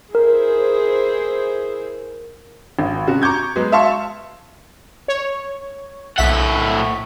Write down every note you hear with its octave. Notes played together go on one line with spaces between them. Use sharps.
E4 G#4 A#4 C5
G#1
C3 C#4 F#4
A#5 C#6 D6 G6 G#6
F#3 G#3 B3
E5 F5 A5 C6 C#6
C#5
B1 A2 E5 F#5 B6